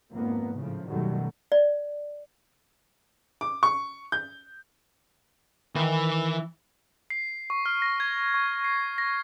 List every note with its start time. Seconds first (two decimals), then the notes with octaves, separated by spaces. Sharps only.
0.12 G#1 F2 A#3 B3
0.56 A2 C#3 F3
0.89 F#2 B2 D#3 F#3 G3 A3
1.52 D5
3.41 D6
3.63 C#6
4.12 G6
5.76 D#3 E3 B4
7.10 C7
7.50 C#6
7.66 F6
7.82 A#6
8.00 G#6
8.34 C#6
8.64 C7
8.98 A#6